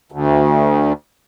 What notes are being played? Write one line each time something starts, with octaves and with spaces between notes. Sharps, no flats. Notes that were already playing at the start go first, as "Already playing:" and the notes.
D2